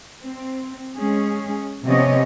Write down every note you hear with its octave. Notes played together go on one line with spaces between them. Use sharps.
C4
G#3 C#4 G#4
C3 F3 B3 C#4 C#5 D#5